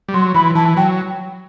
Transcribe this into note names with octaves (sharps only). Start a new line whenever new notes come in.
G3
F#3 C6
E3 B5
E3 A5
F#3 G5